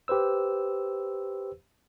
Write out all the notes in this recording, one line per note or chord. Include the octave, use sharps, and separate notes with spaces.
G4 B4 C5 E6